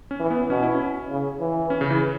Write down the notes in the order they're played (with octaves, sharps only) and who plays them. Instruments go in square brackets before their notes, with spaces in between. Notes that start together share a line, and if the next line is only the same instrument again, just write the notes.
[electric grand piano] C#4
[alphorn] E3
[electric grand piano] B3
[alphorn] B2 [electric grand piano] C#4
[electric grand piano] E4
C#4
[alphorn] C#3
E3
[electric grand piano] C#4
C#3
E3